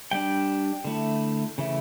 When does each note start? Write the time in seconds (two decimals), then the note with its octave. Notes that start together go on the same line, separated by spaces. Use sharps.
0.11 G3 D4 G5
0.85 D3 A3 E4
1.58 C#3 E3 A3 E4